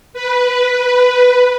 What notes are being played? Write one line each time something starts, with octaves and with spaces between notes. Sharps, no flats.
B4